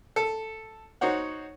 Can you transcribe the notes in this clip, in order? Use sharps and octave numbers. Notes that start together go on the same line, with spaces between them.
A4
D#4 F#4 C5 C#5 F#5